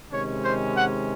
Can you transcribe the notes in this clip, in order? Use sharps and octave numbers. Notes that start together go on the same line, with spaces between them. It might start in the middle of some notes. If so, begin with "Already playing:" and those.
C3 D#3 G#3 C#4 C#5
C5
F#5